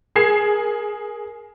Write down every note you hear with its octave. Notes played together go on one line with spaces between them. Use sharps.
G#4 A#4 G#6 C7 E7